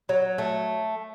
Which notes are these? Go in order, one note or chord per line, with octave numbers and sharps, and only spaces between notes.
F#3
A3